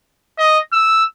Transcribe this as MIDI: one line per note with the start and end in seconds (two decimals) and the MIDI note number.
0.38 0.59 75
0.73 1.04 88